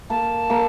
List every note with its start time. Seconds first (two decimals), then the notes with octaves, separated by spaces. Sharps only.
0.09 A#3 A5
0.50 A#3